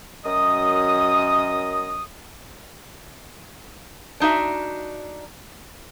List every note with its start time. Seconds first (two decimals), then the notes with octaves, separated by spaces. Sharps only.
0.24 F#2 D#5 D#6
4.20 D4 D#4 F#4 E5